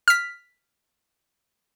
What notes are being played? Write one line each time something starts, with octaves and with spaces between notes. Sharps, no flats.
F6 B6